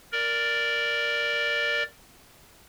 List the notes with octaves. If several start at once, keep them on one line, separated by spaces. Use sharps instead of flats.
A#4 D5